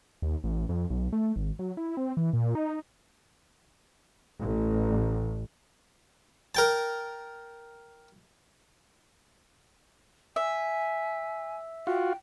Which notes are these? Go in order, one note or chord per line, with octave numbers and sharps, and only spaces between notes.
D#2
A1
F2
B1
A3
G#1
F#3
E4
C4
E3
A#2
D#4
A1
A#4 G5 A5
E5 G#5
F4 F#4 G5